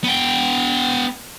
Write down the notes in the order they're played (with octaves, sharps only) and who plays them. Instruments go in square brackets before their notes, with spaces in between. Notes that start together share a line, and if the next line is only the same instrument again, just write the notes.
[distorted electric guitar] B3 G5